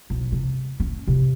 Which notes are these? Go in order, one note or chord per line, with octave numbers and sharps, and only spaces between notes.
B1
C3
C#4
C3